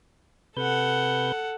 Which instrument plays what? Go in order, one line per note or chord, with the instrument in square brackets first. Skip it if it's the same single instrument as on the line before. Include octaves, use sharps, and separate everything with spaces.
[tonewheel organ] C3 B4 G6 [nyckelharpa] A4 F#5